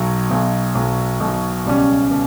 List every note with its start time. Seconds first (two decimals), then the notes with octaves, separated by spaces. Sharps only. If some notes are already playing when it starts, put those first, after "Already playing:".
Already playing: B1 B2 F#3
0.30 B1 B2 F#3
0.75 B1 B2 F#3
1.20 B1 B2 F#3
1.65 C#2 B2 G3 C#4
2.11 B2